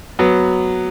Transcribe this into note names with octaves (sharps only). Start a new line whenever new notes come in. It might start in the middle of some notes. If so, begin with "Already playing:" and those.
F#3 B3